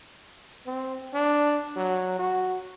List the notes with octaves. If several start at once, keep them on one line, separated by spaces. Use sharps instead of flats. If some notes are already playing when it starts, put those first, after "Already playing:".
C4
D4
F#3
F#4